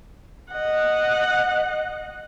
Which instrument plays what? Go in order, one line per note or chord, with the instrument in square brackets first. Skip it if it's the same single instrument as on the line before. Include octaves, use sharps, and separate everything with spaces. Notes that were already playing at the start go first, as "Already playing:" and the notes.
[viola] D#5 F#5